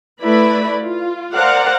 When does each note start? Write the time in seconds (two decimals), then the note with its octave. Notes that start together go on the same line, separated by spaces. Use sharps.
0.21 A3 E4 B4 D5 B5
0.82 F4
1.33 A#4 C5 D5 F5 F#5